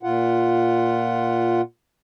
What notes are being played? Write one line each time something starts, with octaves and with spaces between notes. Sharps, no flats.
A#2 F4 F#5